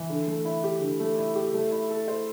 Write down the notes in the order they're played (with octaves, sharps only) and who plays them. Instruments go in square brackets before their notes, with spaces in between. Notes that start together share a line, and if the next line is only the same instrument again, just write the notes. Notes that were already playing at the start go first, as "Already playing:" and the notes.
Already playing: [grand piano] E3
D3
A3
E4
G4
D3
A3
E4
G4
A3
E4
A4
C5